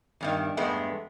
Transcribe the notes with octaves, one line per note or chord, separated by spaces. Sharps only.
E2 G2 D#3
E2 G2 G#3 A3 B3